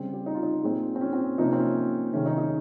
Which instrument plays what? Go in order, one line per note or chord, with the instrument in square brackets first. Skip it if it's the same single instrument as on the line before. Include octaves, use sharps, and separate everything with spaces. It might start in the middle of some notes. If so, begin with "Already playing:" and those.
Already playing: [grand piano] C#3 G3 C4
G4
D#4
F4
D#4
A#2 G#3 C4
C4
C#4
C4
C3 F3 A#3 D#4
C#4
C4
C#4
C3 D#3 G#3 C#4
D#4
D#4